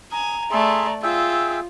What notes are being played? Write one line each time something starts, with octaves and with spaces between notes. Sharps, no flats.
G#5 A#5 D#6
A3 G#4 D5 E5 C6
F4 G#4 E5 G5 E6